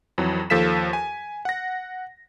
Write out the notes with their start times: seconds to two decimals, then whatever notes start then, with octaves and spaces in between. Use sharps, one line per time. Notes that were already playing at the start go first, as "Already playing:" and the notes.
0.18 F2 E3 F#3
0.50 D#2 F3 A4 F5 B6 E7
0.93 G#5
1.45 F#5 A#6